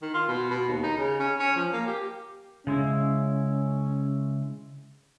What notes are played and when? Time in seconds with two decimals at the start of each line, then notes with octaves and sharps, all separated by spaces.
0.02 D#3
0.14 F4
0.28 B2
0.51 B2
0.68 D#2
0.83 D#4
0.97 C#3
1.20 C#4
1.40 C#4
1.56 F3
1.73 A#3
1.88 G4
2.67 C#3 G#3 C#4 E4